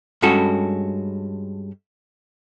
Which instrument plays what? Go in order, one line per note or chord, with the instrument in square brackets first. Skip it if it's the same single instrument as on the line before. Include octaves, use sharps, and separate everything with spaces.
[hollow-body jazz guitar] G2 G#3 C#4 F#4 A4